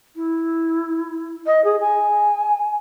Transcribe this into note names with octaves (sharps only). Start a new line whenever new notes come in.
E4
D#5
G#4
G#5